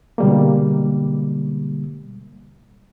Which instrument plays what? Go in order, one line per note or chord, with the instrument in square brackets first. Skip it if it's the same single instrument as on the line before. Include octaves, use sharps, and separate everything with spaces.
[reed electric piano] B2 D3 G3 G#3 A#3